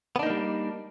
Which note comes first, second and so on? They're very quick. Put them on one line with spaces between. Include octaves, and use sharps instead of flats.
B3 D4 D#4 A#3 G3